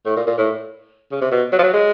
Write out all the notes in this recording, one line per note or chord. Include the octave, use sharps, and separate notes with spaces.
A2
A#2
A#2
A2
C#3
C3
B2
F#3
F3
F#3
G#3